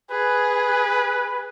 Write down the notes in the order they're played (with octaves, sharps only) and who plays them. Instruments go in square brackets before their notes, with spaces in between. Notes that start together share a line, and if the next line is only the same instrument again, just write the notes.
[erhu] G#4 [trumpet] B4